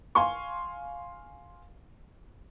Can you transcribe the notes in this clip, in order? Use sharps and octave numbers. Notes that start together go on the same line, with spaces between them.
F5 G#5 C6 C#6